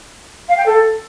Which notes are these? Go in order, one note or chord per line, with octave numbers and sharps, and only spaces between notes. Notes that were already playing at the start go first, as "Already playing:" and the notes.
F5
G5
A4